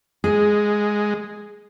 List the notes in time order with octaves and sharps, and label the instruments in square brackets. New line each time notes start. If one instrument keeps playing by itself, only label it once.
[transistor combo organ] G#3 [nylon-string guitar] G#4